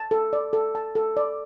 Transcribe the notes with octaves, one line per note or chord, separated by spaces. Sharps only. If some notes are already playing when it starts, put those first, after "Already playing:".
Already playing: A5
A4
D5
A4
A5
A4
D5